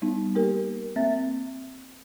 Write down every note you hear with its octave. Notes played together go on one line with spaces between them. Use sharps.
G3 B3 D#4
A#3 G4 A#4
A#3 C4 E5 A6